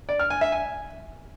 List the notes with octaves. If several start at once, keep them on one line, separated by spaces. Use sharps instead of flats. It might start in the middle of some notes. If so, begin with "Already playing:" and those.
D5
F6
G#5
E5
G#5